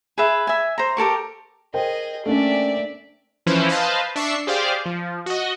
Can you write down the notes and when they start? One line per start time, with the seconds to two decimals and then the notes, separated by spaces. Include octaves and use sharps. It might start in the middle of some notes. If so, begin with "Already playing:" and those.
0.18 G#4 B4 E5
0.47 E5 G#5
0.78 C5 A#5
0.97 G4 A4 A#4 C#6
1.74 G#4 A#4 C5 D#5 G5
2.26 A3 A#3 C#4 D4 D5 E5
3.46 E3 F3 C#4 E4 B4 C5
3.69 B4 C5 D#5 F5 A5
4.16 D4 E5 C#6 C7
4.47 G4 G#4 C5 D5 F5
4.86 F3
5.26 F#4 D#5